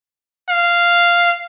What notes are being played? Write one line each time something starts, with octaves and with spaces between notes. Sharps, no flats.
F5